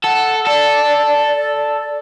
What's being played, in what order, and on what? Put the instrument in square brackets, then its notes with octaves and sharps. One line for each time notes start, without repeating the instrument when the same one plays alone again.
[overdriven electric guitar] A4 [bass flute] F#5
[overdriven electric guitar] A4 [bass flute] D5